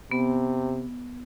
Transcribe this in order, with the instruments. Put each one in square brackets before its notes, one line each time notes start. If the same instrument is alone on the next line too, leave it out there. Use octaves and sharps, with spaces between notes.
[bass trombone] C3 [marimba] B3